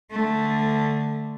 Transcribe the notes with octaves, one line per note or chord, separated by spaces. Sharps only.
D3 A3